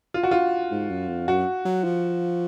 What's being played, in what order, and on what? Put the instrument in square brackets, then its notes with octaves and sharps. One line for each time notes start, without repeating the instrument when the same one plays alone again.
[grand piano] F4
F#4
F4
[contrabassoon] G#2
F#2
F2
[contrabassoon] F#2 [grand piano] F#4
[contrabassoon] F#3
F3